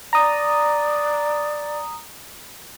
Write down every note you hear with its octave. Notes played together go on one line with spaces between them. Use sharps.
D5 A#5 D#6